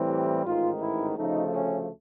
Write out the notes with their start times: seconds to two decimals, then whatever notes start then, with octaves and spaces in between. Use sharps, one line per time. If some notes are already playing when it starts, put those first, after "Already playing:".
Already playing: A2 E3 G3 C4
0.09 G4
0.44 A1 G#2 D#3 F4
0.81 E4
1.17 D2 C#3 F3 A3 D#4
1.53 C#4